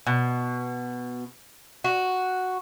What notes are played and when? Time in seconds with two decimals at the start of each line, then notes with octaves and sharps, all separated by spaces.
0.07 B2
1.84 F#4